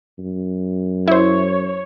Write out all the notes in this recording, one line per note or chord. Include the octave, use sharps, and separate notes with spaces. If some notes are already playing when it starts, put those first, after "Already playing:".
F#2
E4 C5 C#5